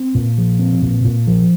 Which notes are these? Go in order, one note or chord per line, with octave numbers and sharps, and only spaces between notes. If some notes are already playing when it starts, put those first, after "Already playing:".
Already playing: C4
A#2
F3
C4
A#2
A#2
F3